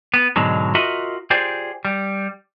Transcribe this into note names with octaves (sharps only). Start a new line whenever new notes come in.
B3
G#2 B2 D3 F#3 G#3
F4 F#4 A#4 D#5 E5 F#5
F4 G4 G#4 C5 D5
G3